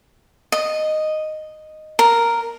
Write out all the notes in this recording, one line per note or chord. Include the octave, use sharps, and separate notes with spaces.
D#5
A#4